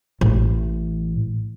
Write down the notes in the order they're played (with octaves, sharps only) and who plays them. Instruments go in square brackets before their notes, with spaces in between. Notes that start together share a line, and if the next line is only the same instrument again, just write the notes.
[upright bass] A1